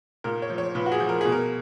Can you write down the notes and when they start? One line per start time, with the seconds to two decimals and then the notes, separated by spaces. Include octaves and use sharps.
0.24 A#2 A#4
0.42 C#5
0.50 F3
0.58 C#5
0.75 A#2 B4
0.86 F#4
0.92 G#4
1.00 F3
1.09 A#4
1.21 B2 G#4
1.32 A#4